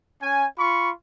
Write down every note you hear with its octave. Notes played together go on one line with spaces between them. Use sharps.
C#4 G#5
F4 B5 C#6